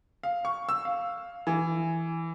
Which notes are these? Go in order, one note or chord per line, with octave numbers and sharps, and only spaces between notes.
F5
C#6
E6
F5
E3